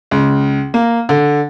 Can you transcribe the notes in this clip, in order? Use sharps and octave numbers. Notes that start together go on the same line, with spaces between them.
C#2
A#3
D3